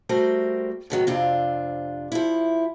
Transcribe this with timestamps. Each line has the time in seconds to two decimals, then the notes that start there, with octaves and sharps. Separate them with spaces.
0.09 G3 A3 F#4 G4 A#4 C5
0.90 A2 D#3 F#3 B3
1.07 F2 C3 D4 F4
2.12 F3 E4